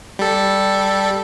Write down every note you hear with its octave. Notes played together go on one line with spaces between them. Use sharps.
G3 A4